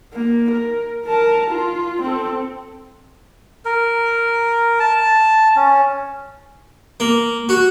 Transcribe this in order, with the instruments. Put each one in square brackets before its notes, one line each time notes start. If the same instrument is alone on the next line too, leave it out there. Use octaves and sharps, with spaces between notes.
[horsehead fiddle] A#3
A#4
A#4 A5
F4
C4 A4
[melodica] A#4
A5
C#4
[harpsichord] A#3
F#4